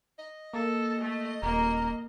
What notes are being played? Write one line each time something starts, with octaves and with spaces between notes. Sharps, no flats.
D#5
A#3 A4
A3
D#1 A#3 A#5